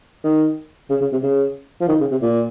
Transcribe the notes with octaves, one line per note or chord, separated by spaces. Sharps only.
D#3
C#3
C#3
C3
C#3
F3
D#3
C#3
C3
A#2